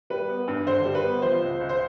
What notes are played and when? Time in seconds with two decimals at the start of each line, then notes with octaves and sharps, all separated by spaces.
0.10 G3 B4
0.29 B3
0.48 G2
0.66 D3 C5
0.85 G3
0.95 B4
1.04 B3
1.22 F3 C5
1.42 C#2
1.60 C#2
1.69 C5